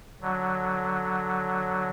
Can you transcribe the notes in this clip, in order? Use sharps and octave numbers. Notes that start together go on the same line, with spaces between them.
D3 F#3